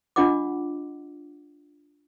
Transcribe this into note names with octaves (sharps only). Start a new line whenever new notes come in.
D4 F4 D#5 F#5 D6